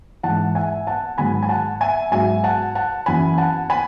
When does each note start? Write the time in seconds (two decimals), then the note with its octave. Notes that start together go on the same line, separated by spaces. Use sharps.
0.23 G#2 E3 F#5 A5
0.55 E5 G#5
0.87 F#5 A5
1.18 G#2 D#3 F#3 G#5 B5
1.43 G#5
1.49 F#5 A5
1.81 E5 G#5
2.12 G#2 F#3 E5 G#5
2.44 F#5 A5
2.75 F#5 A5
3.06 F#2 E3 G#5 B5
3.38 F#5 A5
3.70 G#5 B5